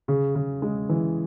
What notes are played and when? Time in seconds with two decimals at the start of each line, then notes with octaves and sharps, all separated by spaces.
0.08 C#3
0.35 C#3
0.62 G#3
0.89 E3